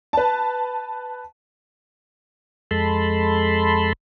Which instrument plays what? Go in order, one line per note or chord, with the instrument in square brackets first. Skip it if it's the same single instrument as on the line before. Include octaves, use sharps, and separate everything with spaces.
[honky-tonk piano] B4 A5
[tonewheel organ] F2 G#3 A4 A5 B5 C6